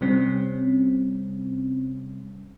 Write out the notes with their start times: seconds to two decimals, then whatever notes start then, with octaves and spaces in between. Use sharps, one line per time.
0.01 C3 G3 C4 C#4